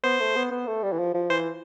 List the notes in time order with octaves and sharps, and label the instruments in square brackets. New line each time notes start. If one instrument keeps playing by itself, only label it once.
[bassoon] B3 [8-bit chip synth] C5
[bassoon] A3
B3
B3
A3
G3
E3
F3
F3
[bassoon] E3 [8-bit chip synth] C5